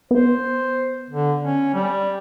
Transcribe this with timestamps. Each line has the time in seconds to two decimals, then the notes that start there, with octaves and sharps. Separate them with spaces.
0.11 B3 C5
1.10 D3
1.43 C#4
1.74 G3